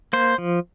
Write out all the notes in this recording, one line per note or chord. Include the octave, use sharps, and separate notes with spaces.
A#3 C5
F3